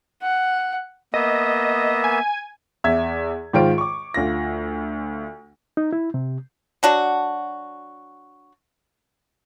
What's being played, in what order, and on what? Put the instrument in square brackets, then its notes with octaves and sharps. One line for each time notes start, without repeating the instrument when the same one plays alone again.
[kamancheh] F#5
[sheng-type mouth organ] A#3 B3 E5 [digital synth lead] D#5
[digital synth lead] G#5
[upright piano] E2 E5 G#6
G#2 D#3 F4 C5 D7
C#6 D6
D2 F4 A#6
[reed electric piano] D#4
E4
C3
[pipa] F#3 D4 F#4